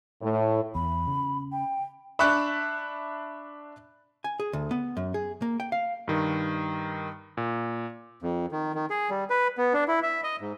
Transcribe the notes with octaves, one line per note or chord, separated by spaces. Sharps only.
A2
E2 B5
C#3
G5
D4 E5 B5 C#6 F#6
G#5
G#4
D2
B3
F#2
G#4
A#3
G5
F5
G2 D#3
A#2
F2
D#3
D#3
G#4
G3
B4
B3
D4
E4
E5
D#5
G#2